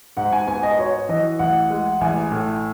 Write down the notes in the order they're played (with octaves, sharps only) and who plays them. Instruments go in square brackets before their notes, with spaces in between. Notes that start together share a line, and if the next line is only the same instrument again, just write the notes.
[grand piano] G#2 [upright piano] F#5
[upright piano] G#5
[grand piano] B3 [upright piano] G#5
[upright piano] D#5
[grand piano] F#4 [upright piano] C#5
[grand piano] E3 [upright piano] D#5
[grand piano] A1 [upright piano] F#5
[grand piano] G#3
[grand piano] A1 [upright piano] G#5
[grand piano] A2